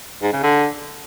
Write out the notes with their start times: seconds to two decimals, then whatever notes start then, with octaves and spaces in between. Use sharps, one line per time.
0.23 G#2
0.33 C#3
0.43 D3